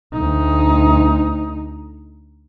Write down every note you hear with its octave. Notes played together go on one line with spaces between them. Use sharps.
D2 D#4